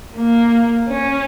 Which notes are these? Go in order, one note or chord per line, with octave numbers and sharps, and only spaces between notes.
A#3
C#4